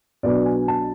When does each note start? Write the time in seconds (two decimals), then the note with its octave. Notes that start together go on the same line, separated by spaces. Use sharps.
0.23 B1 B2 F#3 B3 D4 D5
0.46 G#5
0.68 A5